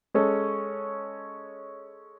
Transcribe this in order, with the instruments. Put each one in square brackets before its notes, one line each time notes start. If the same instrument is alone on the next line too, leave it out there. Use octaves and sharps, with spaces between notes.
[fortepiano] G#3 C#4 A4